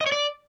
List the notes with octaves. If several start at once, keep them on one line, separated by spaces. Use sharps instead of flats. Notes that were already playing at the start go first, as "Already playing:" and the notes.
D#5
C#5
D5